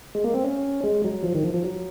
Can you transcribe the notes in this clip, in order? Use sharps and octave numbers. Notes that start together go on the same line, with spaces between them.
G#3
A#3
C4
C#4
G#3
F#3
F3
D#3
F3
F3
F#3